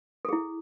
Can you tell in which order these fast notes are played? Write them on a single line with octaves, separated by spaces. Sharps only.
A4 G#4 E4